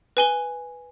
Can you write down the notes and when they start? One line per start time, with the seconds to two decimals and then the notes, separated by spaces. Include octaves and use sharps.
0.17 B4 G#5 G7